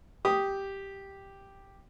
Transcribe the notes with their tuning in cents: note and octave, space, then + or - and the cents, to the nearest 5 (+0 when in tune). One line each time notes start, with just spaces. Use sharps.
G4 +0 D#6 +0